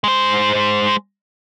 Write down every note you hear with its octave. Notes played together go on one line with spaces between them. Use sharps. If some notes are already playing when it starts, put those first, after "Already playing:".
G#3 C5